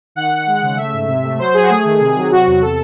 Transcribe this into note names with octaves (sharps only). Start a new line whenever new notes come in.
D#3 F#5
D#3
G#3
C#3
A3 E5
G#2
C3
A3
F#3 C5
F#3 G#4
F#4
A3 G#4
D#3
C3
F#3
C3 F#4
E2
C3 A4